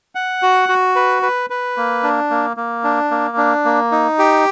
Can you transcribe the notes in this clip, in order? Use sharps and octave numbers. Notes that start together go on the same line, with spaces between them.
F#5
F#4
F#4
B4
B4
B4
A#3
D4
A#3
A#3
D4
A#3
D4
A#3
D#4
G4